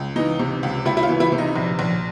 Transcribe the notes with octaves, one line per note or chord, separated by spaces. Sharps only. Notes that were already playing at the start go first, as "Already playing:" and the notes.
Already playing: C#2
E3 D#4
C3
C#2
C#2 E4
E4
F4
E3
E4
C3
D#4
A#1
A#1